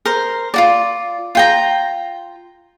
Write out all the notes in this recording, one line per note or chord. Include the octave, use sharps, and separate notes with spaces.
A#4 C5
F4 F#4 D5
F4 G5 A#5